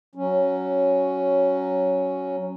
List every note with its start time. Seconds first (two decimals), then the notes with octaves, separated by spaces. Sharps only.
0.15 F#3 C#4